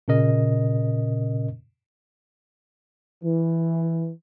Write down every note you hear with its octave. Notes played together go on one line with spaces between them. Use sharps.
A#2 C#3 C#4 A#4 D#5
E3